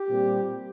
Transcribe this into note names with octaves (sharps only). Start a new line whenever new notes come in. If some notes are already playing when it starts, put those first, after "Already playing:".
Already playing: G4
A#2 G3 C4